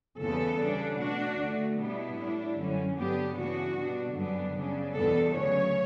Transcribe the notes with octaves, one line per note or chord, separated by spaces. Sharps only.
E2 C#3 G3 B3 A4
C#3 G3 D4
B2 A3 D4 F#4
D2 D3 A3
B2 G3 B3 D4 E4
A2 G3 D4
F#2 D3 G3 C#4
G2 D3 F#3 B3 D4 G4
C#3 E3 B3 D4 F#4
B2 G3 D4
F#2 D3 G3 B3 D4
C#3 G3 D4
E2 B2 G3 B3 D4 A4
D2 C#3 F#3 C#5